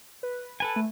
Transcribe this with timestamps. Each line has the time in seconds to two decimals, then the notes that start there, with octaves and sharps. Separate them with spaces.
0.23 B4
0.60 A4 B4 G#5 A5
0.76 A3